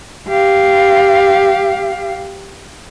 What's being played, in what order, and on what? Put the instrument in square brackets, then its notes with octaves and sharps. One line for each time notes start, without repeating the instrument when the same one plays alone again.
[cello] G4 F5